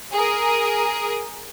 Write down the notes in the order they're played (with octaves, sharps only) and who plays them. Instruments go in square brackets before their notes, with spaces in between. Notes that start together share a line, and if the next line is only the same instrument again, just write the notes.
[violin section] G#4 A#4 D#6